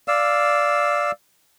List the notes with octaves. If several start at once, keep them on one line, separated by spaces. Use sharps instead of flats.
D5 F5 E6